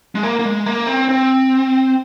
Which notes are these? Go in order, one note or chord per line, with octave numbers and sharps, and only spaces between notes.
G#3
A#3
A#3
G#3
A#3
C4
C4